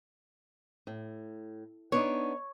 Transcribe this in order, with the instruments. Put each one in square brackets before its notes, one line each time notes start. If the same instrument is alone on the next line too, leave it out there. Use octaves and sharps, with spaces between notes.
[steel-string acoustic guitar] A2
[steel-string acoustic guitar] B3 D4 D#4 [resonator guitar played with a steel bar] C#5